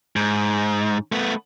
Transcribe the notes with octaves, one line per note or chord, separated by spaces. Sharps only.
G#2
A3 B3